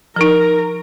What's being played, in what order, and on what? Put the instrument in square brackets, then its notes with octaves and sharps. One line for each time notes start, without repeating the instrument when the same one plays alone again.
[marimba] F3 D#4 [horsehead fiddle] A#4